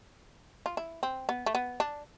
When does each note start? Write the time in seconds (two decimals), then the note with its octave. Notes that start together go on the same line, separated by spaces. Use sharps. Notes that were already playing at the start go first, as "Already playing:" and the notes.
0.66 F4
0.77 E4
1.03 C4
1.29 B3
1.46 A3
1.55 B3
1.80 D4